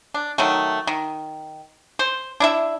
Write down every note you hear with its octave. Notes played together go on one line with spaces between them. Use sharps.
D4
D#3 F#3 A3
D#3
C5
D4 E4 E5